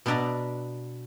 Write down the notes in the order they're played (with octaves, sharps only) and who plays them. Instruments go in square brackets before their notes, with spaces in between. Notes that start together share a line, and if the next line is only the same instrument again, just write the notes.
[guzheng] B2 B3 D4 D5 E5 A#5